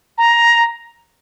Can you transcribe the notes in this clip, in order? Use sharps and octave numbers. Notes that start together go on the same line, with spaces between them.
A#5